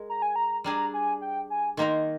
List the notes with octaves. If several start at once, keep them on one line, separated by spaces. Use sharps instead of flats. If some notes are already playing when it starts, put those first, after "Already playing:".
Already playing: G#3 A#4
A#5
G#5
A#5
G3 D4 G#4 A#5
G#5
G5
G#5
D#3 A#3 D#4 A#4 C6